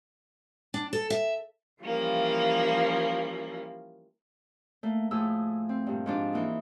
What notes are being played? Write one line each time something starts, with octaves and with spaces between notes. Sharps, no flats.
D4
A4
E5
E3 F3 G3 A#3 C#4
A3 A#3
A2 F3 A3 G#4 E6
C4
G2 A#2
G#2 F3 D4
E3 A#3 D#4